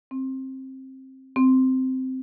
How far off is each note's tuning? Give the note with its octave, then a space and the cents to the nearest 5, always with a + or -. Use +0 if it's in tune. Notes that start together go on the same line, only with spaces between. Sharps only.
C4 +15
C4 -10